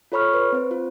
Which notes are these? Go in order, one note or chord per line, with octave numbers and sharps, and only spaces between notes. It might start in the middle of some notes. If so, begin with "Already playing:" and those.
F4 A4 C#5 B5 C#6 F6
B4
C4 C5
F4